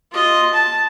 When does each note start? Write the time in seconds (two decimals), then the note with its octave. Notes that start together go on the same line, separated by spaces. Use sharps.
0.12 F4 D#5
0.54 A5